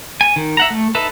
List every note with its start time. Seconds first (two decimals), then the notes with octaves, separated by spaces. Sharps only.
0.21 G#5
0.36 D#3
0.57 E5 F#5 A#5
0.70 A3
0.95 D#4 A4 B4 E5